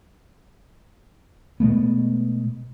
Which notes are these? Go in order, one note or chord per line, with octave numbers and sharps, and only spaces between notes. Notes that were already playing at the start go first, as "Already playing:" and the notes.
B2 G#3 A3 B3